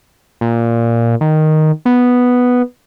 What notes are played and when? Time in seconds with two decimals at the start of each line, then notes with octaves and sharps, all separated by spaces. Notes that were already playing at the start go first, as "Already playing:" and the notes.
0.41 A#2
1.21 D#3
1.85 B3